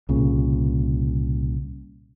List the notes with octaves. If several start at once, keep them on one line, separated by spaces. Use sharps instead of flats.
C2 A#2 C#3